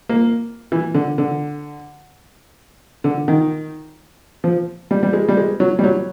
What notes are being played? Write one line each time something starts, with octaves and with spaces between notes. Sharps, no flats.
A#3
E3
D3
D3
D3
D#3
F3
G3
G3
G#3
G3
G#3
F#3
G3
F#3